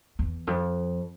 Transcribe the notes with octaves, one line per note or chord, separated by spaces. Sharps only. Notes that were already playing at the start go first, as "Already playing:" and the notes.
E2
F2